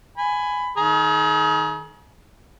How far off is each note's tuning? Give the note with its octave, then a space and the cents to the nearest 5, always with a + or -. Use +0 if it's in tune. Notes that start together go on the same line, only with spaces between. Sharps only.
G#5 +0 B5 +15
D#3 +0 G#4 +40 A#5 +45